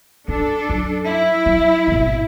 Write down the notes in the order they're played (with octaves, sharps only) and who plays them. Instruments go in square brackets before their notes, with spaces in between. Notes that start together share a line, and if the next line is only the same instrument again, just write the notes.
[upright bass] F#2 [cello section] D4 A4
[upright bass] F#2 F#3
[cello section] E4
[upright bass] F#3
G#1 B2